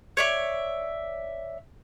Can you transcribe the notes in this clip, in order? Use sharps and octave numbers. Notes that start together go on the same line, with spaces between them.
C#5 D5 E5